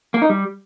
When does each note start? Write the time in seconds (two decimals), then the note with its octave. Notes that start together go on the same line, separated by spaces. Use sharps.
0.14 A#3
0.22 D#4
0.30 G3